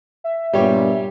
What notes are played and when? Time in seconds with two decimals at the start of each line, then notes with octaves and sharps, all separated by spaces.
0.24 E5
0.53 G2 A#2 G3 B3 G4 C#5